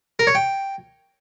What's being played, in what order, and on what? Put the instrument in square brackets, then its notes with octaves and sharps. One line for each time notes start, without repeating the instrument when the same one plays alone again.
[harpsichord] A#4
C#5
G5